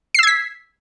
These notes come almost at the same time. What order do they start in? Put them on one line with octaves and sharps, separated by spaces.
C7 E6 G#6 B6